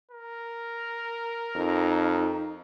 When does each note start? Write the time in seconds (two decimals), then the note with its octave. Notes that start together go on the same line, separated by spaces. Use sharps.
0.11 A#4
1.56 F2 D#4